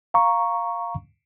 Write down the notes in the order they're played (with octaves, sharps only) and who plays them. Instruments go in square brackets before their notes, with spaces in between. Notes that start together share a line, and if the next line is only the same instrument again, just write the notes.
[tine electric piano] F5 A#5 C#6